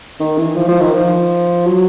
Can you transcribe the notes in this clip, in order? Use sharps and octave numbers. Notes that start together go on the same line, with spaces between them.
D#3
E3
F3
F3
D#3
F3
F#3